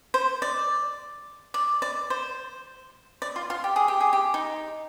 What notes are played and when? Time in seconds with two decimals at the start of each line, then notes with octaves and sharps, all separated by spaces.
0.14 C5
0.42 D5
1.54 D5
1.82 D5
2.10 C5
3.22 D5
3.36 F4
3.50 F4
3.64 G4
3.76 G#4
3.88 G4
4.01 G#4
4.13 G4
4.34 D#4